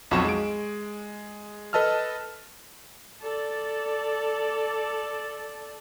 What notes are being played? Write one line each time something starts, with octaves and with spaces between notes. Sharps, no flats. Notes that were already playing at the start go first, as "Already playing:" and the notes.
B1 F2 F#4 C#6 E7
G#3 D7
A4 B4 D#5 A5 E6 F6
A4 D5